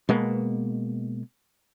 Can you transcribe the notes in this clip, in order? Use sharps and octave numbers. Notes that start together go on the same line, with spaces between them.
B2 G#3 A#3 B3